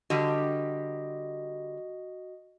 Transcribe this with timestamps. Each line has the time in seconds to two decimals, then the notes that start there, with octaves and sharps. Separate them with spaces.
0.10 D3 G3 F#4 G4 D#5